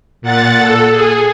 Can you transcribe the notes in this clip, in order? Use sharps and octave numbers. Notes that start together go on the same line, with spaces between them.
A#2 F#5 A6
A4
G#4